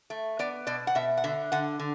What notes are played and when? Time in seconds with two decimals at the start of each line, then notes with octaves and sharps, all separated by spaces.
0.10 A3
0.39 B3 D5
0.67 B2 D5
0.87 F#5
0.95 B2 E5
1.17 F#5
1.24 D3 E5
1.52 D3 F#5
1.80 D3